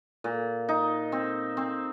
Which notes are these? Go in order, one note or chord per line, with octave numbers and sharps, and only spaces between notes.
A#2
D#4
C4
C4